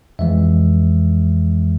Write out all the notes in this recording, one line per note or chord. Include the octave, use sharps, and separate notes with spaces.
F2 E3 G#3 E5